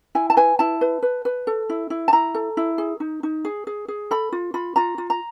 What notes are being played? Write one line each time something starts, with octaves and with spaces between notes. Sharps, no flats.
E4 G#5
A5
B4 G#5
E4 A5
B4
B4
B4
A4
E4
E4
A5
E4 A#5
A4
E4
G#4
D#4
D#4
G#4
G#4
G#4
A4 B5
F4
F4 B5
F4 A#5
F4
A#5